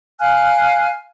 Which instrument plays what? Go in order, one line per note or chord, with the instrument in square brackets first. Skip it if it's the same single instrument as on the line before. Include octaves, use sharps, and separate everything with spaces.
[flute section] F5 G#5 F6 F#6